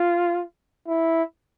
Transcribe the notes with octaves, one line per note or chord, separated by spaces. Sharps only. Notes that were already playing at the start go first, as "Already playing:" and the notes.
Already playing: F4
E4